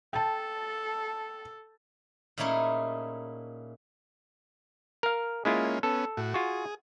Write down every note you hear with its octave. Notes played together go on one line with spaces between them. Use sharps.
A4 G5 A5
A#2 A3 C#4 D#4 E4 G#4
A#4 F5
G#3 A#3 C#4 E4 F4
B3 C#4 A4
A2 F#4
F4 F#4 G#4